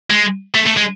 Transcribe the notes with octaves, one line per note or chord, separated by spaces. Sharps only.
G#3
A3
A3
G#3